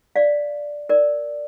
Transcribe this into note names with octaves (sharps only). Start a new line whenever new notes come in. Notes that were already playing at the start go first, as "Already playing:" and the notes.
D5 F5
A#4 D5